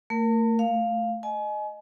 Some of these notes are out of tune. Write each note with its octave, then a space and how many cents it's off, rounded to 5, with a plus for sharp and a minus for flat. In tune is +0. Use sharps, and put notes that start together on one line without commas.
A3 +40 A#4 +0
A3 -5 F5 +0
D#5 -15 G#5 +35